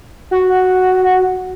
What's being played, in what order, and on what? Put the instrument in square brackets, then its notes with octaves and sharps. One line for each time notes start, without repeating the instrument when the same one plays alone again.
[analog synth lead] F#4
[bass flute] F#5